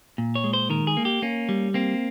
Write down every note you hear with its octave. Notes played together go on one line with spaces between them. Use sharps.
A#2
C#5
G#3
C5
D#3 A#4
G#4
A#3
G4
A#3 C#4
G3
A#3 C4